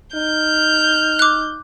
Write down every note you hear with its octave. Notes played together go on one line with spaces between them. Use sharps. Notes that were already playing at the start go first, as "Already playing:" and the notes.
D#4 F6 G6
D6 F#6